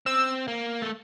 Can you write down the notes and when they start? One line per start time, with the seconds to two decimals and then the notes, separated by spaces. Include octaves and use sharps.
0.06 C4 E6
0.48 A#3
0.82 A3